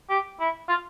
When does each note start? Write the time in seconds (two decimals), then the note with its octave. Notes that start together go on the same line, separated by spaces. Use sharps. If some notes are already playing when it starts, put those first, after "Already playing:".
0.10 G4
0.40 E4
0.69 F4